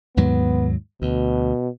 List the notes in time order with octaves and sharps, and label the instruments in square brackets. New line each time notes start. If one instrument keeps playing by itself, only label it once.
[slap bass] D#2 G#2 F#3 [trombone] B3
[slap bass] D2 [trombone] B2